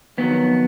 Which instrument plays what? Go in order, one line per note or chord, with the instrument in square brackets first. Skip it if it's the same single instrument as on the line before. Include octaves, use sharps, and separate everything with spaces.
[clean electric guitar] F2 D#3 F#3 B3